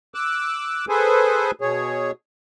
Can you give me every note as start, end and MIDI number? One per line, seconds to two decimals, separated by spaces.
0.14 0.85 86
0.14 0.85 88
0.14 0.85 90
0.89 1.51 68
0.89 1.51 69
0.89 1.51 71
0.89 1.51 72
0.89 1.51 80
1.61 2.11 47
1.61 2.11 68
1.61 2.11 73